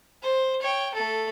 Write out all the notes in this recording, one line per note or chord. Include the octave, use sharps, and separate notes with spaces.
C5
C#5 G5
A3 A4